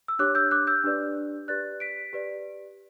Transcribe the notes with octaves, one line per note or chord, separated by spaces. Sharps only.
E6
D4 G4 C#5 D6 F#6
E6 G6
D6 F#6
E6 G6
D4 G4 B4 D5
G4 B4 D5 F#6 A6
B6 D7
G4 B4 D5